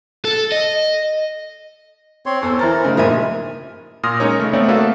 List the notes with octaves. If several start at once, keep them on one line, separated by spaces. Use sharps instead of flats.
A4
D#5
C4 C#5 C6
E2 A4 C5
E3 A#4 A#5 A6
C#3 A3 D#4
G2 A#2 F3 G#3 A#4 E5 G#5
A#2 C6 D#6 F6 A#6
G#3 C#4 D#4 A#4 C#5
C#3 G#3 A3
A3 B3 C4 C#5 D5 E5
A#3 F#4 A4 B4 C#5 F5